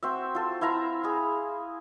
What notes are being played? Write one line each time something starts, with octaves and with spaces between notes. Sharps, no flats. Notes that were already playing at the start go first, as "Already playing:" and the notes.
C4 F#4 E5
F4 A4
E4 E5 F5 A#5
G#4 B5